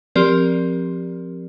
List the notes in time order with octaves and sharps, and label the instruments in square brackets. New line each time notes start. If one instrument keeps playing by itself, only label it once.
[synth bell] F3 C4 G4 A#4 D5